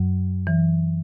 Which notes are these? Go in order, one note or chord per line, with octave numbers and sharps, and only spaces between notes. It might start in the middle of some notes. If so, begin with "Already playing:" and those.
Already playing: F#2 F#3
E3